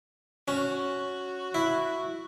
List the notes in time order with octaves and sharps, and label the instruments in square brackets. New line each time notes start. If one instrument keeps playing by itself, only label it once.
[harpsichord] C#4 [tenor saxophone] F#4
[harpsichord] E4